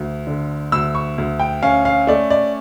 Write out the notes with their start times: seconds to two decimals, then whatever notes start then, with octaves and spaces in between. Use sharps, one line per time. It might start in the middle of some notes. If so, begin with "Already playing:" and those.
Already playing: D2
0.27 D3
0.72 D2 E6
0.95 C#6
1.18 D2
1.40 G5
1.63 C#4 F5
1.85 F5
2.07 A3 D5
2.30 D5